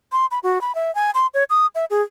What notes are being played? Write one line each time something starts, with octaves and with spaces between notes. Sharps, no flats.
C6
B5
F#4
B5
E5
G#5
C6
C#5
D#6
E5
G#4